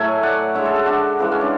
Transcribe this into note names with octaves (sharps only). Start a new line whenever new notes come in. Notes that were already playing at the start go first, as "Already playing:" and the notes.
Already playing: A2 F#3 A3 E5 G#5
D5 F#5
D3 G#3 C#5 E5
A4 C#5
F#4 A4
D4 F#4
C#3 E3 G#3
C#4
D4